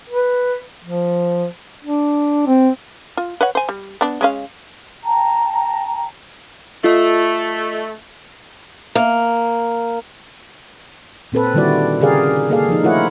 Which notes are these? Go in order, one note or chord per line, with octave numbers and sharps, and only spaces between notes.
B4
F3
D4
C4
F4
B4 C#5 F#5
C5 G#5
G3
B3 D4
G#3 C#4 F5
G5 A5 A#5
A3 F4 D#5
A#3
A#2 C4 A4 B4
D3 D#3 G3 E4 F#4 D5
C#3 G4 G#4 A#4 D5 F5
A#3 G#4 A4 D5 F5
F3 D#4
A3 E4 F4 A#4 C#5 F#5